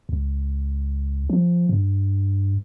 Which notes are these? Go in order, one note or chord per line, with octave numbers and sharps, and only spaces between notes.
C#2
F3
G2